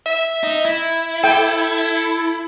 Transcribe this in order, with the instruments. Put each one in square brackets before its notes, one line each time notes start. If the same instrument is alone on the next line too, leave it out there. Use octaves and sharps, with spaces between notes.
[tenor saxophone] E5
[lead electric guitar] D#4
E4
[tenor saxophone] A4 [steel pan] G5